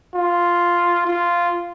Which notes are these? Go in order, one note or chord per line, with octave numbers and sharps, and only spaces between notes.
F4
F4